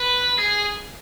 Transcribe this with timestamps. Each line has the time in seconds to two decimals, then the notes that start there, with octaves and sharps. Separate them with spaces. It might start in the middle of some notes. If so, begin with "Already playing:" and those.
Already playing: B4
0.39 G#4